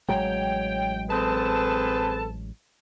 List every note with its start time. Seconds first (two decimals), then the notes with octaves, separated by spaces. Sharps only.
0.09 A1 F#3 G#3 C#5 G5
1.10 C4 G#4 A4 B4 A5